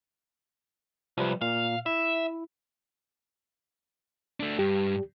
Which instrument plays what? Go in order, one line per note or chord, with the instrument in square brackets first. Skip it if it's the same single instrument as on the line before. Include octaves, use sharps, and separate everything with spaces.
[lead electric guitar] C2 [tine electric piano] F3 G3 B4
[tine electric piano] A#2 [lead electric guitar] F5
[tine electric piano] E4 [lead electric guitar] E5
[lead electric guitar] A3 D4
[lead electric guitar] G2 [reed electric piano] G4